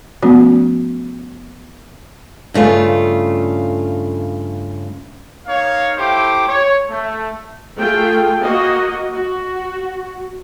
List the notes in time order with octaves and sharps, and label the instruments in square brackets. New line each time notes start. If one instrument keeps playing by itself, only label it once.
[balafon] F3 A3 B3 C#4 F#4
[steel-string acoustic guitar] G2 C#3 A3 F4
[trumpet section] A#3 D#4 C#5 F5
A3 E4 G4 C5 G5 D6
C#5
A3
[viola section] A3 F4 G#4 G5
A#3 F#4 D#5
F#4